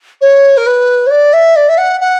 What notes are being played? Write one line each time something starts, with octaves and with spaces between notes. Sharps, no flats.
C#5
A#4
B4
C#5
D5
E5
D5
E5
F#5
F#5